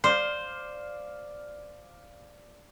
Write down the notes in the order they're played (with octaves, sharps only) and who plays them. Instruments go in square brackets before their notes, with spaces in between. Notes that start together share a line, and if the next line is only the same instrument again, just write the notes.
[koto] C5 [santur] D5 F5